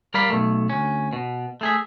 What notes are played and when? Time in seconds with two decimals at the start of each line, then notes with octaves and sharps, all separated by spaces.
0.14 G3 A#4 D5 F5 B5
0.30 B1 A3
0.70 D2 C#4
1.13 B2
1.61 A3 G#4 E5